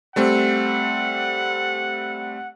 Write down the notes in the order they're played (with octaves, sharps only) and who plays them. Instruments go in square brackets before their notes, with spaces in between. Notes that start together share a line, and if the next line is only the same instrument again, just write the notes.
[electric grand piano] G3 A3 C4 [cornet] F#5